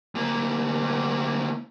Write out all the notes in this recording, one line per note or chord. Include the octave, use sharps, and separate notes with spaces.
D2 A#3